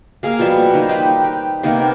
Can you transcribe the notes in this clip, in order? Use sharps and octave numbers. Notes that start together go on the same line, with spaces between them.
A#3 G#4 F5
B2 F3 G3 A5
D#3 A#3
D#4 G4 B4 C5
G4
C3 D#3 A#3 B3